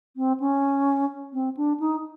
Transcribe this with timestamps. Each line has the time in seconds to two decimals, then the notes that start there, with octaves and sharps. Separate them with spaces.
0.17 C4
0.40 C#4
1.33 C4
1.57 D4
1.80 D#4